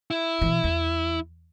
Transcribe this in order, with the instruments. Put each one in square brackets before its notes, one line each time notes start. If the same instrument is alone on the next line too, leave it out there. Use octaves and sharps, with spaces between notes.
[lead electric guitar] E4
[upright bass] B2 E3
E2